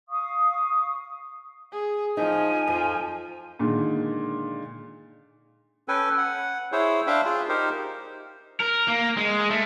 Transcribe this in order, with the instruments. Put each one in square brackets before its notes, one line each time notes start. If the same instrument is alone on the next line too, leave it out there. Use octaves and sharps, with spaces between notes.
[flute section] F5 C#6 D#6
[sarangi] G#4
[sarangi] F3 [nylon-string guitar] D#4 [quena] G#5
[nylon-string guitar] F2 [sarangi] F3
[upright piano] A#2 D3 D#3 G#3
[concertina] C#4 A4 B4 G5 G#5
F#5
E4 G#4 C5 C#5
D4 C5 E5 F5 G5 B5
F4 G#4
D#4 G4 A#4 C5
[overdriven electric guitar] A#4
A#3
G#3
A3